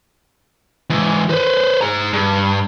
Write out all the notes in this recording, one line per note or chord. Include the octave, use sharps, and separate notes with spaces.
G#2 E3
B4 C5
G#4 A#5
G2